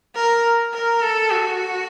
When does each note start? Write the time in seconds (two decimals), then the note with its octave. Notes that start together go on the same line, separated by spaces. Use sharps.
0.16 A#4
0.73 A#4
1.02 A4
1.31 F#4